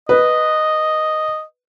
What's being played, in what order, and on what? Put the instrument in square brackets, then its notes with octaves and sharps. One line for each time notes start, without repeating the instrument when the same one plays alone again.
[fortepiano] B4 [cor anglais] D#5